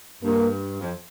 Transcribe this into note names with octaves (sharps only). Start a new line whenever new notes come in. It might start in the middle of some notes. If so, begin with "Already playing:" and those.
G2 A#3
F2